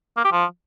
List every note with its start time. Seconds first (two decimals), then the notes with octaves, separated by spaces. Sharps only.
0.17 A#3
0.25 G4
0.32 F3